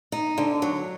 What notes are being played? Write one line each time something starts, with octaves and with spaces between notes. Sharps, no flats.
D#4
D3
F#3